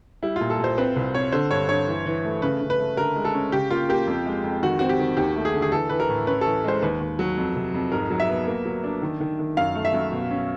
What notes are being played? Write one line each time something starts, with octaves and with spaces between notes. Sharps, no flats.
G3 E4
F4
A#2
A4
A#2 C5
C4 B4
C2
C4 C#5
D3 C5
G2 C#5
G2 C#5
E3
E3
A3
C#3 B4
C#3
B4
A3
D3 A#4
G#3
A4
C#4
C#3 G4
A#3 F4
A#3 G4
F2
G#3
F2
D#3 F#4
C4 F#4
G4
D#3
D#2 G4
A3
G#4
D3
G#4
E3 A4
E3 B4
A#4
A2
C#4 B4
E3 A4
G#3 C5
D#2 B4
D#2
F#3
F2
C3
F2
G#2 A#4
F#3
E5
B3
A#3
F#3
D4
D#3
D#3
D#3
F#2 F5
A3
E5
F#2
B2
C#4